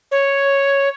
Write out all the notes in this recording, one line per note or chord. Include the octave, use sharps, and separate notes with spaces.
C#5